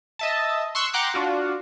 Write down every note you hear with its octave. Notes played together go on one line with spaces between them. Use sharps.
D#5 E5 A5
C6 C#6 E6 F#6
F#5 G5 A#5 C6 D6 F#6
D4 F4 F#4